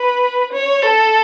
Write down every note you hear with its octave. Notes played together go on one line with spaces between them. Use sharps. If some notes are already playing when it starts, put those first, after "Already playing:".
Already playing: B4
C#5
A4